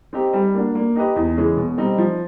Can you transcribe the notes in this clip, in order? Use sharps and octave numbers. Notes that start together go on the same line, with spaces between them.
C4 D#4 G4
G3
A#3 D4 F#4
A#3
D#4 G4 B4 D#5
E2
C#3 E3 G#3 C#4
B2
G3 C4 D#4
F3